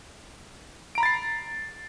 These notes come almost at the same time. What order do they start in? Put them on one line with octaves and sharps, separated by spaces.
D7 A#5 B5 A6 C7